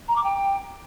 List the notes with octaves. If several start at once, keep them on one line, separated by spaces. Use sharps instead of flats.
A#5
D6
G5